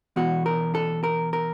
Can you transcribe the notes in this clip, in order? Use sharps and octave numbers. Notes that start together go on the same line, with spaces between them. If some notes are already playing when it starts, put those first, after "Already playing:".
E2 B2 F#4
A#4
A4
A#4
A#4